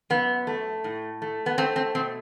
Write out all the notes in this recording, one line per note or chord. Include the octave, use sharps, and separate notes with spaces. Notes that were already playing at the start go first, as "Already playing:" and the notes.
F#2 B3
A3
A2
A3
B3
A3 C4
C4
B2 C4